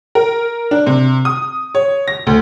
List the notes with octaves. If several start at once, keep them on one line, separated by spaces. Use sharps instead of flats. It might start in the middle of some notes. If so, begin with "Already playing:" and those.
A#4
D4
C3
D#6
C#5
A#6
D2